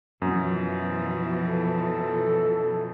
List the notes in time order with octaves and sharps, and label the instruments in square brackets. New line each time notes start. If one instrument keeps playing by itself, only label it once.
[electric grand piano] F#2 [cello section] B2 E3 F3
[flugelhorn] A4